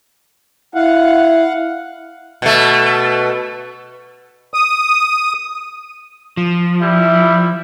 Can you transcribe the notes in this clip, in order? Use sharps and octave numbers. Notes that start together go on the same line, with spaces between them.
E4 F5 F#5
B2 A3
D#6
F3
G3 E4